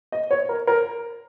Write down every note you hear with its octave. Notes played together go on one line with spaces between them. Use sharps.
D#5
C#5
A#4
A#4